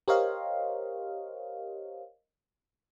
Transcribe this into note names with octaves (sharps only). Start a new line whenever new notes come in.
G4 A#4 C5 C#5 D#5 F5